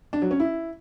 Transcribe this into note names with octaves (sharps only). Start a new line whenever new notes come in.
D4
F#3
C#4
E4